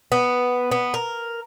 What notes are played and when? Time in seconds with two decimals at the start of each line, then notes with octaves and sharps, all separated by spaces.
0.12 B3
0.71 B3
0.94 A#4